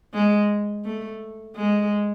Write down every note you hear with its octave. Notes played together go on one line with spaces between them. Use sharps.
G#3
A3
G#3